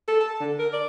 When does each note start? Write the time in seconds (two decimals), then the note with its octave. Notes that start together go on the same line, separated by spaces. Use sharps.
0.08 A4
0.20 A5
0.41 D3
0.59 A#4
0.73 D5